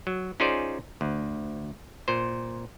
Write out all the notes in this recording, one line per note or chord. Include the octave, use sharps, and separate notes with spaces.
F#3
C#4 D#4 F4 G#4 C5 D5
D2
A#2 C5